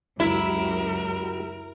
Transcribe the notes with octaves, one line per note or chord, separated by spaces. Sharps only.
C#2 F#2 G#3 E4 F#4 G4 A#4